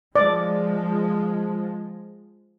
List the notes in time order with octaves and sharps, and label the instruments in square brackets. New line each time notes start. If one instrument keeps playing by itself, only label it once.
[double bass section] F3 G#3 [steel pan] D5